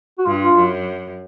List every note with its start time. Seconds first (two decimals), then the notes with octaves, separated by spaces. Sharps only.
0.19 F#4
0.26 G2 F4
0.41 F4
0.55 F#2